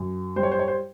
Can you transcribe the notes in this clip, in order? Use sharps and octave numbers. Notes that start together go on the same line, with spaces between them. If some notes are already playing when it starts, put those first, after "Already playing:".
Already playing: F#2
G3 C5
C#5
C5
C#5
C5